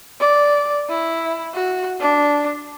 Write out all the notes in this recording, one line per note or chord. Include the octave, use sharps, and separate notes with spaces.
D5
E4
F#4
D4